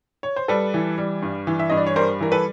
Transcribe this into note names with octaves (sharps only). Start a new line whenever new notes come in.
C#5
C5
G3 A4 B4
E3
G3
G2
E3
E5
G2 D#5
D5
C#5
G3 A#4 C5
E3 A#4
A4 B4